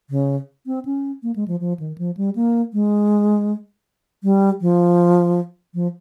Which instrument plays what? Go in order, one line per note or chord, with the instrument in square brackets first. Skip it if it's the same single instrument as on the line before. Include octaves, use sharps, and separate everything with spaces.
[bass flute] C#3
C4
C#4
A#3
G#3
F3
F3
D#3
F3
G3
A#3
G#3
G3
F3
F3